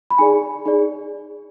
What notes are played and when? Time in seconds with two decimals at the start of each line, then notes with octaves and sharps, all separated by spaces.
0.10 B5
0.18 D#4 G#4 D5 G#5
0.66 D#4 G#4 D5